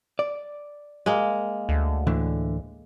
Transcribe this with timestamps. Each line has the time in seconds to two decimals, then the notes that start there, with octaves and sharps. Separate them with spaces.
0.19 D5
1.06 G#3 A#3
1.69 D2
2.07 A2 D3 E3